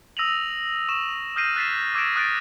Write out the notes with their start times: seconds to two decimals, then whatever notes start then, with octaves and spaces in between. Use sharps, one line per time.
0.17 D#6 E6 A#6 D#7 F7 F#7
0.89 C#6 E7
1.36 D#6 F6 G6 A#6 C7 D#7
1.56 F#6 A6 B6 C7 E7
1.94 D6 E6 G#6 A#6 D7 E7
2.16 D#6 F#6 A6 D7